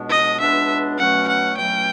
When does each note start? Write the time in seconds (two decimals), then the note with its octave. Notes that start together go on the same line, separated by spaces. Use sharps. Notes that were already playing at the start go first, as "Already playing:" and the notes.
Already playing: C#2 B2 G#3 B3 D4
0.10 D#5
0.40 C#2 B2 G#3 B3 D4 E5
0.98 B2 F#3 A3 C#4 F#5
1.28 F#5
1.57 B2 F#3 A3 C#4 G5